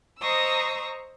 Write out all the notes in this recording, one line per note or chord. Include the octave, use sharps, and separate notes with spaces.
C5 D#5 A#5 C#6 D#6 E6